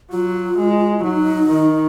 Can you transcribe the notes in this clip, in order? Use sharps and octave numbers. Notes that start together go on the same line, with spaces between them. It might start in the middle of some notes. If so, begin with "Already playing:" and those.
F#3 F4
G#3
F#3 D#4
D#3